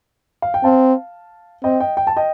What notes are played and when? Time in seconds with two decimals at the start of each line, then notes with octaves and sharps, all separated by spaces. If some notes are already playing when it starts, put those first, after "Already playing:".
0.42 F5
0.54 G5
0.64 C4 F5 A5
1.64 C4 D#5 G5
1.80 D#5 G5
1.97 G5
2.07 A5
2.17 D#5 G5